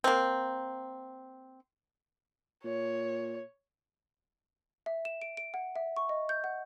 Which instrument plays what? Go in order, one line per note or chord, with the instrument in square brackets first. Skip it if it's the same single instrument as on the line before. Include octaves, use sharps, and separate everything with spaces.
[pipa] A#3 C4
[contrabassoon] A#2 [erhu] C#5
[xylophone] E5
E7
D7
D7
F#5
E5
C#6
D#5
G6
F#5